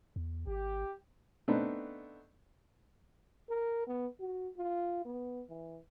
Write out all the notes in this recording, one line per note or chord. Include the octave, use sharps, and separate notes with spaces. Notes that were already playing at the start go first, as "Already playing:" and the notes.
E2
G#1 G4
A3 B3 C4 D4 D#4 B4
A#4
B3
F#4
F4
B3
E3